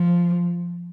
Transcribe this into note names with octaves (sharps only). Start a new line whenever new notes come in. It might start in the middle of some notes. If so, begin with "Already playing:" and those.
Already playing: F3